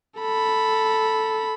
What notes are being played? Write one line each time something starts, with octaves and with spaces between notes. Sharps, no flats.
A4 B5